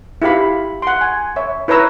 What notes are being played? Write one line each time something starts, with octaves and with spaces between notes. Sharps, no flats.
E4 F4 G4 F5 B5
F#5 C6
G#5
C#5 E5
E4 B4 C#5 A#5 E6